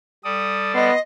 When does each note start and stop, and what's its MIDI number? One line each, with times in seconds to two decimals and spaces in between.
0.25 0.90 55
0.25 0.90 69
0.25 0.90 74
0.25 0.73 87
0.75 0.94 59
0.75 0.99 75
0.75 0.97 84